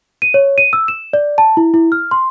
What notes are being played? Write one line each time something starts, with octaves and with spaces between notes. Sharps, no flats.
D#7
C#5
D#7
E6
E7
D5
A5
E4
E4
F6
C6